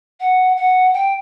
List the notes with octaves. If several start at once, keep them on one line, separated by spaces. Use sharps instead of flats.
F#5
F#5
G5